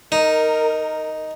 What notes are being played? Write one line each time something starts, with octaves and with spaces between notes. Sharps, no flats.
D#4 A#4